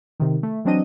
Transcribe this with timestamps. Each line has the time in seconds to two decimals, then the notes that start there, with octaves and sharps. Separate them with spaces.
0.20 C3 D#3
0.43 A3
0.65 E3 F#3 C4 D4 D#5 D#7